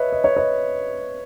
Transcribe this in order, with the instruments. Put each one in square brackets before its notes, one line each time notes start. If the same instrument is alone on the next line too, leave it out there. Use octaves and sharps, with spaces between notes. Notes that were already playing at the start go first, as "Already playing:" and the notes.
Already playing: [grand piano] B4 C#5 D#5 E5
D#5
C#5
B4 D#5